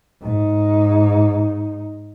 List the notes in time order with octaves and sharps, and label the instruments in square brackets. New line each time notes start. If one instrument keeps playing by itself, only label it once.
[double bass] G#2 D#4